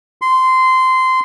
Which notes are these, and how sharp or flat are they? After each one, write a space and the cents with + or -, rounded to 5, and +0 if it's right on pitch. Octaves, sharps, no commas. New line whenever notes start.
C6 -15